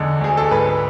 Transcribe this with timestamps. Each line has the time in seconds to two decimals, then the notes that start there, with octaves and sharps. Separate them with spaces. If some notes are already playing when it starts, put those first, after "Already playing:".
Already playing: E2 D3 G#3
0.21 D2 G#4
0.37 A4
0.51 G#2 B4